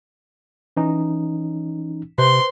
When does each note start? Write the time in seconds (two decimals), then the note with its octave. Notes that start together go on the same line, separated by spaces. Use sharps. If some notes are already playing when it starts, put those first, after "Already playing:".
0.77 E3 C#4 D#4
2.18 C3 B4 C5 C6